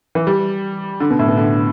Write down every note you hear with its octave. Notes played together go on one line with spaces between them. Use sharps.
E3
G3
D3
B2
A2
B2
D3